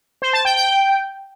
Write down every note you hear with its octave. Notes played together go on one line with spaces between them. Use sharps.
C5
A5
G5
G5